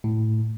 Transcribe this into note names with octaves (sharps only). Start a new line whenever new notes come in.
A2